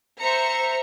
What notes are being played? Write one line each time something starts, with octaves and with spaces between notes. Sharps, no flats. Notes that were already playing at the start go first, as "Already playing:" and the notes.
C5 E5 A#5 C#7